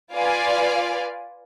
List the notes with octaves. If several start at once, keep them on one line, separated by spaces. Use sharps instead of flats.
F4 B4 D5 F5 G#5